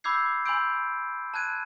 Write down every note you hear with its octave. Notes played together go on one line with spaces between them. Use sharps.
B5 D6 E6 G6 G#6 C7
G#5 B5 C6 E6 G6 D7
A5 F#6 G#6 D#7